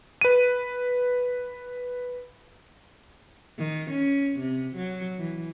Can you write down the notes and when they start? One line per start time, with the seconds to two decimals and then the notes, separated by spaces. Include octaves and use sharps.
0.21 B4 D#7
3.58 D#3
3.91 C#4
4.40 C3
4.76 F#3
5.18 E3